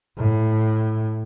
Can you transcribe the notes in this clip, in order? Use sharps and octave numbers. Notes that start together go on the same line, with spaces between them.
A2